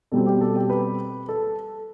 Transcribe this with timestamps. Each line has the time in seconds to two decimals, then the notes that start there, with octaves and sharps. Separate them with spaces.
0.12 B2 G3 C4 A4
0.26 G4
0.41 A4
0.56 G4
0.69 B4
1.29 A4